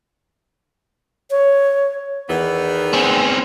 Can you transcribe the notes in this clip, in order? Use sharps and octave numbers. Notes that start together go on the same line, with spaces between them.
C#5
E2 D#3 E3 B3
C4 C#4